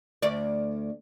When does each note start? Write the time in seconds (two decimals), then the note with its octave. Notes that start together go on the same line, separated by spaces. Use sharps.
0.22 D2 D5